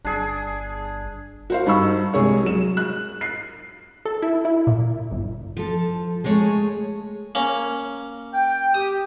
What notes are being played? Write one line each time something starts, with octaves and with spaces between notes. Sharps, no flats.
G1 D4 G#4
F#4 C5 F5
G2 D#4 B5 C#6 E6
C2 G#3 G#4 C#5 C#6
F#3 E7
F#6
C7
A4
E4
E4
A#2
G1
F3 A4
G#3 A3 G#4 C#5
A#3 C#4
G5
G4 D#6